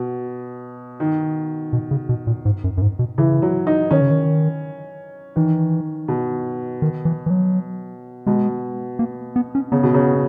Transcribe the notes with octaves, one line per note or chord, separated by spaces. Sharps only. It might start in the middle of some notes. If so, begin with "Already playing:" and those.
Already playing: B2
D#3
B2
C#3
B2
A#2
G#2
F#2
F#2
G#2
B2
C#3 E3
F#3
D#4
D#3 C#4
C#3
D#3
D#3 E3
B2
D#3
E3
E3
F#3
B2 G#3
A#3
B3
C#4
C#3 B3
B2
C#3